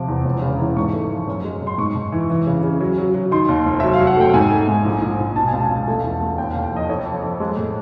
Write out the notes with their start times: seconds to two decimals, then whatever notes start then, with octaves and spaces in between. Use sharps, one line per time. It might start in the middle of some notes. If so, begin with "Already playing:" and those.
Already playing: C3 F3 D6
0.08 E2
0.25 E1
0.42 C#3
0.59 E3
0.77 G#2 C#6
0.93 A3
1.10 F3
1.27 F#2
1.44 G#3
1.62 F#2
1.67 C6
1.78 G#2 C#6
1.96 G#2
2.12 E3
2.30 E3
2.47 C#3
2.63 C#3
2.81 F#3
2.98 F#3
3.14 F#3
3.31 D#3 C6
3.48 D#2
3.66 F1
3.80 F#3 E5
3.93 F5
4.00 F#3
4.07 F#5
4.17 A3 G5
4.34 G#2 G#5
4.51 A3
4.68 G#2
4.85 A#1
5.02 A#1
5.19 A#1
5.36 B2 A5
5.48 G#5
5.53 C#2
5.58 A5
5.70 C#2
5.88 A3
6.04 E2
6.21 A3
6.38 D#2 G5
6.51 D#2 F5
6.72 F3 D#5
6.89 F2 C#5
7.06 F3
7.24 F2
7.40 G#3
7.57 A2